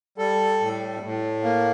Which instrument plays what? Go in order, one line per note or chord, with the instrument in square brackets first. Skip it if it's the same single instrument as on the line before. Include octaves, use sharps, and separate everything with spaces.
[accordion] G3 A4
A2
A2
A#3